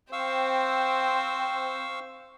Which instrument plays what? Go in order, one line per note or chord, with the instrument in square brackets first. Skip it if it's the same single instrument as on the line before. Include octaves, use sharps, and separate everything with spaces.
[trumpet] C4 [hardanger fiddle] C5 [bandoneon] F5 C#6 E6 [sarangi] G5